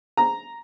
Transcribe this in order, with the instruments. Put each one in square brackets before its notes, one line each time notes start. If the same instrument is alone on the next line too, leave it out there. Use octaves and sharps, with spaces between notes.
[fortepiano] A#5